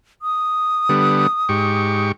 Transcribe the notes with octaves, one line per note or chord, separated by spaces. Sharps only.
D#6
D3 G3 B3
G#2 G4 C#6